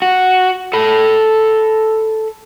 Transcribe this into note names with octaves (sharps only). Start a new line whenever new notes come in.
F#4
A4 B5